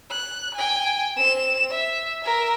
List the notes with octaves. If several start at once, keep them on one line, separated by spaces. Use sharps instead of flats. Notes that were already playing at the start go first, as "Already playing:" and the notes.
F#6
G5 G#5
C4 E7
E5
A#4 E5